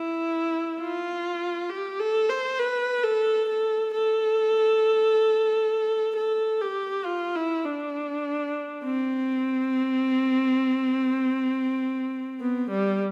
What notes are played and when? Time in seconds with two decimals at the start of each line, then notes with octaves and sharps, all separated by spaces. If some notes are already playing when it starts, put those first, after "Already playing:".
Already playing: E4
0.81 F4
1.70 G4
2.00 A4
2.29 C5
2.60 B4
3.04 A4
3.49 A4
3.94 A4
6.16 A4
6.61 G4
7.05 F4
7.36 E4
7.65 D4
8.84 C4
12.40 B3
12.70 G3